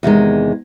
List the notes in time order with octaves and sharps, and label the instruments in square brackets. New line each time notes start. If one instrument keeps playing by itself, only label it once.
[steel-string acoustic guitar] E2 C3 D#3 G#3